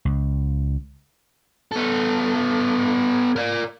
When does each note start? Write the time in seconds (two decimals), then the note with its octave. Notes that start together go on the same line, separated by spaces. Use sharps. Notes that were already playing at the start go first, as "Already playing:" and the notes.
0.05 C#2
1.72 B3 A4
3.36 A#4 D5